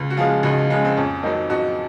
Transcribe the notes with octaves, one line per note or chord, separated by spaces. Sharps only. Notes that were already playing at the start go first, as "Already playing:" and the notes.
Already playing: C#2
F#4
C#3 F3 G#3 F4 G#4
C#2 D#4 F#4
C#3 F3 G#3
C4
F2 C#4
D#3 F#3 C4 D#4
F2 D#4 F#4